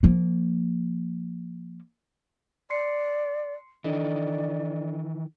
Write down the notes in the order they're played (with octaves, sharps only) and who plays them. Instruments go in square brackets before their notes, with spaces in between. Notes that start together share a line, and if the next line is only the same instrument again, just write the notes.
[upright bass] F3 A#3
[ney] D5 [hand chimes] C6 C7 C#7
[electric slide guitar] D#3 E3 [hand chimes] D4 A4 D#5 [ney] D5